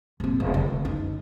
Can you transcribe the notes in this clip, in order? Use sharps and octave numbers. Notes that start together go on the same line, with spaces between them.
D#1 C4
F1
D3
F#2 D#4